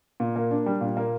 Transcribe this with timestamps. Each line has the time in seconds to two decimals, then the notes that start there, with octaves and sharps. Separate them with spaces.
0.20 A#2
0.36 A#3
0.51 D4
0.66 G3
0.81 A#2
0.97 A#3